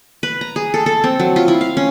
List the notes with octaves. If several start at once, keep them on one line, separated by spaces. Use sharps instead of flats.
B4
A#5
G#4
A4
A4
C4
F#3
F4
E4
F5
C#4